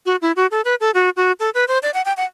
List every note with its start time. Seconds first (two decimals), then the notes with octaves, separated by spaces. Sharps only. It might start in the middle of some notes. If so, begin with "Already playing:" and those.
0.06 F#4
0.22 E4
0.36 F#4
0.51 A4
0.65 B4
0.81 A4
0.94 F#4
1.17 F#4
1.40 A4
1.54 B4
1.68 C5
1.83 D5
1.94 F#5
2.05 G5
2.17 F#5